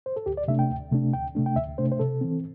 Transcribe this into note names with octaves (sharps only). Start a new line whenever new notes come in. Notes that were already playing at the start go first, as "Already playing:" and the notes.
C5
A4
D2 G4
D5
C3 A3 D4 E5
G5
D2
C3 A3 D4
D2 G5
C3 A3 D4
G5
D2 E5
C3 A3 D4 C5
C5
C3 A4
E3 C4